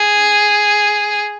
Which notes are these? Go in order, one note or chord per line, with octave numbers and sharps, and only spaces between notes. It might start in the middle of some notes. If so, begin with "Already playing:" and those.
Already playing: G#4